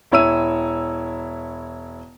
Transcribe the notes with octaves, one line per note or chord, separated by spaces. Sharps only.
E1 E4 C#5 E6 D#7